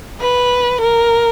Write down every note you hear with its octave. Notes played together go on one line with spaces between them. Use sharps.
B4
A#4